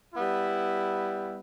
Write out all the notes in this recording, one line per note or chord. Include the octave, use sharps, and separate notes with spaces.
G3 B3 E4